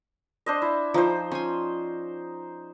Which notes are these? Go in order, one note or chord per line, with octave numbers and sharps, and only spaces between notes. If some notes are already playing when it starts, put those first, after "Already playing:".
D4 C5 D#5
E4
F3 D#4 C5
C#4 G#5 C6